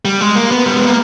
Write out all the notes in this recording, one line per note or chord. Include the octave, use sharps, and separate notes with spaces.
G3
G#3
A#3
B3
G3
G#3
A#3